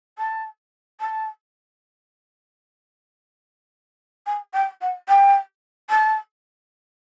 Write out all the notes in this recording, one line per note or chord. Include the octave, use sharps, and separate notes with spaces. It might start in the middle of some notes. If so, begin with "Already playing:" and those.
A5
A5
G#5
G5
F#5
G5
A5